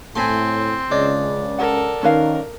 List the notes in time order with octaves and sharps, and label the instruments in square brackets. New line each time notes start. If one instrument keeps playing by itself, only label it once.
[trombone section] A2 [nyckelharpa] C4 [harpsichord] G#5 B5 C6 [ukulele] A5
[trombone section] C#2 C#3 [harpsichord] D4 [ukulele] C#5 D#5
[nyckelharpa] A4 A#4 [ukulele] F#5
[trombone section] D#3 [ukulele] C#4 B4 F5 [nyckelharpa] A#4